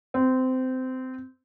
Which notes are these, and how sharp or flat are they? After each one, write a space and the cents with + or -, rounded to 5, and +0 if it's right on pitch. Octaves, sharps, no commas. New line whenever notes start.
C4 -20